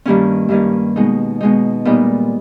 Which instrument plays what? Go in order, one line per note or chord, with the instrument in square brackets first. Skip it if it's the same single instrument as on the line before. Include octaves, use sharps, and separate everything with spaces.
[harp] G2 D#3 G3 A#3 C#4
G2 D#3 G3 A#3 C#4
B2 G#3 D#4
B2 G#3 D#4
A#2 G3 B3 D#4